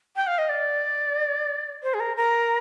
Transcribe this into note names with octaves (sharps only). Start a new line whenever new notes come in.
G5
F5
D#5
D5
C5
G#4
A#4
A#4